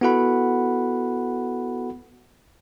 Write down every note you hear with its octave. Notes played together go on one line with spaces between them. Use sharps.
B3 E4 F#4 A4 F#5 B5